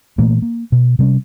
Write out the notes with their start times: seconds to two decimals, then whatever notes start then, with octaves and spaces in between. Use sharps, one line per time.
0.18 A#2 E3 A3 A#3
0.42 A#3
0.72 B2
0.99 C3 G3 C4 C#4